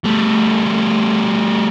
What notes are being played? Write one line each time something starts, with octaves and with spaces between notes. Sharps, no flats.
G3 A3